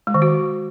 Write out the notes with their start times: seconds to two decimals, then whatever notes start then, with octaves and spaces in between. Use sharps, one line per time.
0.07 G#3
0.14 D#3
0.22 F#4